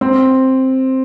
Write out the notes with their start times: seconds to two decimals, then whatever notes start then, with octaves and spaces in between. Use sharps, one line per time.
0.01 C4